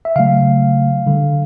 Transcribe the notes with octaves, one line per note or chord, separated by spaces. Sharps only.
E5
C#3 F#3 A3 F5
D3 G3